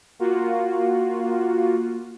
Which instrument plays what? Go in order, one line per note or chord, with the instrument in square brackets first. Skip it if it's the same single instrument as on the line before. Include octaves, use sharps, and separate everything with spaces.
[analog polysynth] A#3 F4 F#4